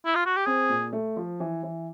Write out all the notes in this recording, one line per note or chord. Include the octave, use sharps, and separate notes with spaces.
E4
F4
F#4
G4
C4 G#4
A#2
A3
F3
E3
E3